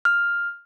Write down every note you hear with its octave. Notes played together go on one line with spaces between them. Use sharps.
F6